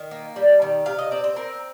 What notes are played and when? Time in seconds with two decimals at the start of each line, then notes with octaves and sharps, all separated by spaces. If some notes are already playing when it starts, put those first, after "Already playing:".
Already playing: D#3
0.11 A#3
0.36 G3
0.62 D#3
0.86 C3 F5
0.99 D#5
1.11 C4 D5
1.24 C5
1.36 C4 A#4